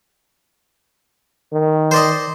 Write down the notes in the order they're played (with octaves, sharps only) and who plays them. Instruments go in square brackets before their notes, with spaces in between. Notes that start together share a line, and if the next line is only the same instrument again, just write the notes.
[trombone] D#3
[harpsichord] C5 D5 D#5